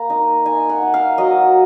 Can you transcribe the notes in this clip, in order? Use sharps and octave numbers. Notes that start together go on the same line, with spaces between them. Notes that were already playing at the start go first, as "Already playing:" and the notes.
Already playing: A#3 A#5
D#4
D#4 G#5
F#5
D#4
F5
F#3 D#5